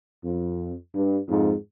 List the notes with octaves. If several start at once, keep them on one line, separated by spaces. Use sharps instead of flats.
F2
G2
F2 G#2